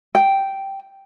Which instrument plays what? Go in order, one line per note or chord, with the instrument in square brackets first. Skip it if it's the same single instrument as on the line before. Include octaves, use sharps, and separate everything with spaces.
[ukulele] G5